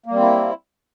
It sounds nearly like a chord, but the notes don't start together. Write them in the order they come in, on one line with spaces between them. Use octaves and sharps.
A#3 G3 C4 E4